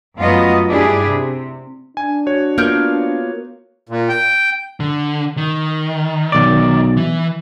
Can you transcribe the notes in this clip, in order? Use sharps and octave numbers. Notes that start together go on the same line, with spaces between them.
F#2 F#3 A3 B3 F4 D#5
G2 D4 E4 G4 G#4
C3
D4 G#5
F#4 C#5
A#3 B3 F4 A#4 G6
A#2
G5
D3
D#3
B1 D5
E3